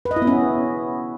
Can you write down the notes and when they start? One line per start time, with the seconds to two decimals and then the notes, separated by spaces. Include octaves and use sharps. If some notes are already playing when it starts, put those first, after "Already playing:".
0.05 B4
0.11 D#5
0.16 E4
0.22 B3
0.27 C#4